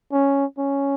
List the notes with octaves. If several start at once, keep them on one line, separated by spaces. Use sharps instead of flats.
C#4
C#4